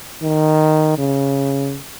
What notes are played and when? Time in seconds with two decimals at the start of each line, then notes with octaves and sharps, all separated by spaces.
0.22 D#3
0.98 C#3